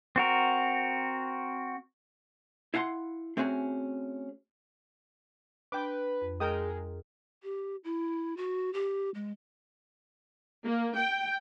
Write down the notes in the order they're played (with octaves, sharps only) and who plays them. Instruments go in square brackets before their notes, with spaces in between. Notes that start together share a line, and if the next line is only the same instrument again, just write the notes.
[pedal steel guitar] C4 F#4 A#4
[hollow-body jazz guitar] E4 F5 F#5 G#5 C6
A3 C4 C#4 F#4 G#4
[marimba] D4 [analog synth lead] B4 [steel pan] G5 D6
[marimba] F2
[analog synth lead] G#3 [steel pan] A#4 G5 D#6
[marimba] G#4
[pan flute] G4
E4
F#4
G4
G#3
[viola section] A#3
G5